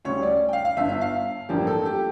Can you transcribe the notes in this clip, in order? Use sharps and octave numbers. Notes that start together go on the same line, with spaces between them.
D2 C#3 G3 C#5
D5
G5
F5
F5
G1 G2 D3 E5
E5
F5
A1 G2 D3 F3 A#3 G4
A4
G4